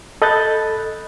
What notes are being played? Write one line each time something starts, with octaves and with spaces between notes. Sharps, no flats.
A4 D#5 B5 F#6 G6 A6